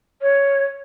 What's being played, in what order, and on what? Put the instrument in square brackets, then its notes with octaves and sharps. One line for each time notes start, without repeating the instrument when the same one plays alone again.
[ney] C#5